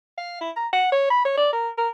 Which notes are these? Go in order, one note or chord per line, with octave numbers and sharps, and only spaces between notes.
F5
E4
A#5
F#5
C#5
B5
C#5
D5
A#4
A#4